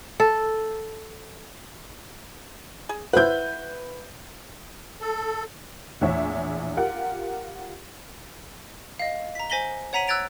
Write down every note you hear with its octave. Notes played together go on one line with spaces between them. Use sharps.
A4
G#4
E4 B4 C5 F#5 G6
A4
A#1 E2 A2 C#5 E5
F4 G4 A#4 F#5
D#5 F5
A#5 B6
C5 G#5 A#6 B6 F#7 G7
C#5 F#5 A#5 B6 D#7 F#7
E6 F#6 G#6 A6 D7 F7